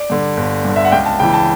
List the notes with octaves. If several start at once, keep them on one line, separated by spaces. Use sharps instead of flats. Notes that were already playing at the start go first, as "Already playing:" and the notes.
Already playing: D5
G2 D3
G1
G2 D3
E5
F#5
C#2 G5
A5
C#3 E3 G5
A5